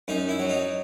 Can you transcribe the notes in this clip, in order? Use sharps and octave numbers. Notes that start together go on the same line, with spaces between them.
F#2 D#4
E4
F#3
D#4